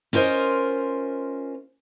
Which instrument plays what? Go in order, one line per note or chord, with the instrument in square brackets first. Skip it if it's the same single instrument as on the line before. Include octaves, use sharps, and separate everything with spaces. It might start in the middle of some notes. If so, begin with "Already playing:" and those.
[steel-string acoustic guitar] C#4 F4 A#4 C5 D#5